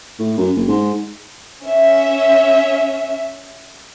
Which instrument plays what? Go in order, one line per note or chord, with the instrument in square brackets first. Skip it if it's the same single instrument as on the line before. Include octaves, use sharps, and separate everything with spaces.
[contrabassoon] A2
F#2
F#1
G#2
[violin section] C#4 E5